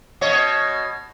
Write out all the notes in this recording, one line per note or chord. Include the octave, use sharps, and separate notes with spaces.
B2 C#5 D#5